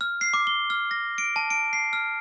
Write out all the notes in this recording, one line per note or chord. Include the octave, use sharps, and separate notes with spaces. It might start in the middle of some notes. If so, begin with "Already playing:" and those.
F6
C7
D6
G7
F6
A#6
D7
A5
D7
C7
F6